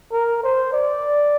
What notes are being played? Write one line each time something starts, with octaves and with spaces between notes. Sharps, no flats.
A#4
C5
D5